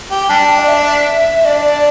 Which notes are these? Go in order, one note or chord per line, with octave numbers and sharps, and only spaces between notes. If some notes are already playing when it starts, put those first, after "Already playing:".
G4
G5
G3 D4 A5
G5
D5
E5
D4 D5
D5